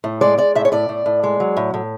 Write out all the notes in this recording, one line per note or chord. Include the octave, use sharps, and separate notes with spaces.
A2
G#3 D5
G#3 D5
A2 E5
C#5
A2 D5
A2
A2
G#3
F#3
A2
A2